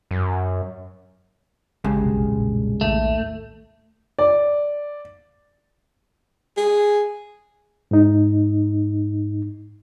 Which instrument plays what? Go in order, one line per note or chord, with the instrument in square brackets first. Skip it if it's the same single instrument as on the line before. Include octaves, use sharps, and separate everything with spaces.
[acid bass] F#2
[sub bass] A1 [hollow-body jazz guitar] G2 C#3 G#3
[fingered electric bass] F1 B1
[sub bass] A#2
[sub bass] A#1 [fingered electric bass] D#2 A2 [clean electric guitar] A3
[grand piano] D5
[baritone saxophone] G#4
[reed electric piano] G#2 D#4